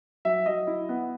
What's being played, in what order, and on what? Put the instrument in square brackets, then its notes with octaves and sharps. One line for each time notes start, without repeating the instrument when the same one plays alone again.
[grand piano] F#3 E5
F#3 D#5
E4
B3